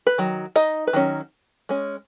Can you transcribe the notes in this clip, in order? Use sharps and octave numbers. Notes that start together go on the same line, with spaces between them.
B4
D#3 F#3
D#4 D#5
B4
D#3 F#3 C#4
G#3 C#4